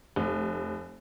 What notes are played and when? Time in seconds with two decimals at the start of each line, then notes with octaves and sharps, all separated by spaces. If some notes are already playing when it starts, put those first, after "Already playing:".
0.16 F1